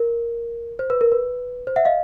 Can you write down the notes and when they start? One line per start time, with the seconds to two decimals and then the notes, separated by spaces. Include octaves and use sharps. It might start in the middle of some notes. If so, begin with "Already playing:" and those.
Already playing: A#4
0.79 C5
0.90 B4
1.01 A#4
1.12 B4
1.67 C5
1.76 E5 F#5
1.85 D#5 F5